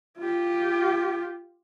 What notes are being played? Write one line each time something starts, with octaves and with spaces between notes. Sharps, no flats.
F4 G4